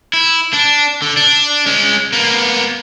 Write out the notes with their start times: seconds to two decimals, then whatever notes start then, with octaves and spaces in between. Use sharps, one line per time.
0.13 E4
0.53 D4
1.02 D3
1.17 D4
1.66 G#3 C#4
2.13 A#3 B3